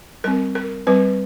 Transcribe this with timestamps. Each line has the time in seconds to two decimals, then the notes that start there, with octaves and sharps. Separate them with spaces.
0.24 G3 C4 A#4
0.55 A#4
0.87 G3 C4 B4